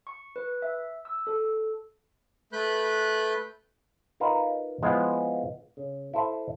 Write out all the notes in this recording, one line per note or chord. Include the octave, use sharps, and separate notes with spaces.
C#6
B4
E5
E6
A4
A3 B4 B5 F#6 G6
D#4 F4 A#4 B4 F5
F3 G#3 B3 E4 F4
C#3
E4 A4 C5 E5